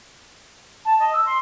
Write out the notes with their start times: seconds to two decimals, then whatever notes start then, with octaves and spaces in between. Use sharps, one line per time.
0.85 A5
0.99 D#5
1.13 E6
1.26 C6